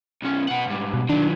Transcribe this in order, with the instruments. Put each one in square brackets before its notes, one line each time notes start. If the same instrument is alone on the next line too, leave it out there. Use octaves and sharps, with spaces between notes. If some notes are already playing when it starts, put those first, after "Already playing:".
[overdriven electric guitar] B1 C#4
B2 F#5
G#2 G3
[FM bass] B2
[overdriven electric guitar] D#3 F#3 [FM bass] D4